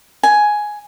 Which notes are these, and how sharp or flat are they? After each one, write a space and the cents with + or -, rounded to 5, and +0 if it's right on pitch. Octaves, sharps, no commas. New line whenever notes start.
G#5 +10